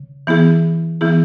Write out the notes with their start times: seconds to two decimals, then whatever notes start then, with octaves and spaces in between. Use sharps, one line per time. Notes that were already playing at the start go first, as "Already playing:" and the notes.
Already playing: C#3
0.27 E3 B3 E4 G#4
1.01 E3 B3 E4 G#4